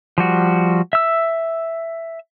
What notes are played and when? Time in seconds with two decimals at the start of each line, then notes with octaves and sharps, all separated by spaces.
0.18 F3 G3 F#4
0.93 E5 E6